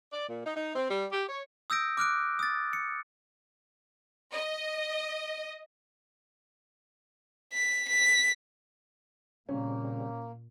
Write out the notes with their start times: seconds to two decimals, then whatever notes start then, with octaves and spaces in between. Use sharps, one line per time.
0.12 D5
0.28 A#2
0.44 D#4
0.55 D#4
0.75 C4
0.89 G3
1.11 G4
1.28 C#5
1.70 D#6 E6 G6 A#6 D7
1.97 D6 F6 F#6 D7
2.39 D#6 A6
2.73 C#7
4.33 D#5
7.53 B6
7.88 B6
9.49 A#2 C#3 G3 A#3 C4 C#4